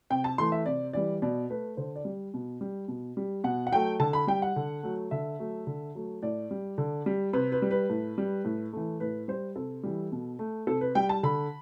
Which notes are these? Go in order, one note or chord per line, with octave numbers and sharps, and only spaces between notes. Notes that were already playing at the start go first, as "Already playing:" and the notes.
C3 G5
A5
E3 A3 C6
E5
C3 D5
E3 G3 D5
B2 D5
A3 B4
D3 C5
D5
G3
B2
G3
B2
G3
B2 F#5
F#5
F#3 A3 G5
D3 A5
B5
G3 G5
F#5
D3
F#3 A3
D3 E5
F#3 A3
D3
F#3 A3
A2 D5
G3
D3
G3
C3 B4
B4
G3
B4
A2
G3
A2
E3 A3
A2 B4
G3 C5
C3 A4
E3 G3
B2
A3
C3 A4
B4
G3 G5
A5
D3 B5